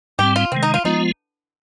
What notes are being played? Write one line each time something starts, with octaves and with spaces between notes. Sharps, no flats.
G#2 G3 C4 G4
F4
C3 D#3 G#3 C4
D#4
F4
F3 G#3 B3 D#4 F4